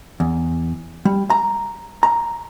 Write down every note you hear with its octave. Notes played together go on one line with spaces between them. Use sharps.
E2
G3
A#5
A#5